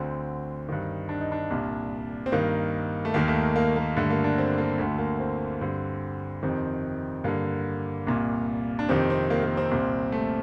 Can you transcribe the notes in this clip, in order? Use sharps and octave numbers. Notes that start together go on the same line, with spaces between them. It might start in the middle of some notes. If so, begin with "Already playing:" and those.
Already playing: D2 D3 C4
G2 D#3
D4
D#4
D4
C2 A#2
C4
G2 D#3 A#3
A3
D#2 D#3 A#3
A3
A#3
A#3
G2 D3 A3
A#3
D4
C4
A#3
D2 D3 A3
A#3
C4
G2 D3 C4
F2 C3 D#3 C4
G2 D3 A#3
C2 A#2
D4
F2 C3 D#3 C4
C4
A#3
A#3
C4
C2 A#2
A3